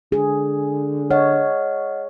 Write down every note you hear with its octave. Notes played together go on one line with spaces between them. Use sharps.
D3 G#4
C#5 D#5 F#5 F6